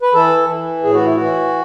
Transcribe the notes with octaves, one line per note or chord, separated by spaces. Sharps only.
B4
E3 A4
E3
A2 G#4
F#4
E4
E3 F#4